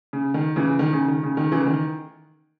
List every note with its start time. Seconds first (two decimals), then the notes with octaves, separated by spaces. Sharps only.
0.13 C#3
0.34 D#3
0.56 C#3 E3
0.79 D#3
0.93 C#3
1.08 D#3
1.23 C#3
1.37 D#3
1.52 C#3 E3
1.67 D#3